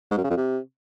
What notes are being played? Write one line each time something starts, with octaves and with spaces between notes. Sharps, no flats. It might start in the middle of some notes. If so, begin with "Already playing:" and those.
G#2
F#2
C#3
F2
C3